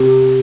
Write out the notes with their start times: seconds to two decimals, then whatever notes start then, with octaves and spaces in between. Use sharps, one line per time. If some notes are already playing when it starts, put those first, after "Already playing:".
Already playing: C3